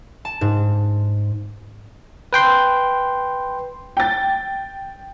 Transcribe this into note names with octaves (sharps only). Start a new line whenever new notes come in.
A5
G#2
B4 G5 C6
G5 A6